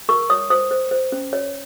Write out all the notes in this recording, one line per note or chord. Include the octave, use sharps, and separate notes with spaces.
A#4 C#6
C#5 D#6
C5 D#6
C5
C5
C#4
C#5